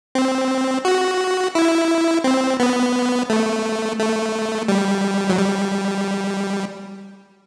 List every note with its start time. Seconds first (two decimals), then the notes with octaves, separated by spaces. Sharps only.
0.15 C4
0.85 F#4
1.55 E4
2.24 C4
2.60 B3
3.30 A3
3.99 A3
4.68 G3
5.30 F#3
5.39 G3